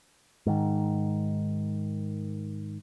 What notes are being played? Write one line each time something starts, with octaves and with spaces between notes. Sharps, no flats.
G#2 D#3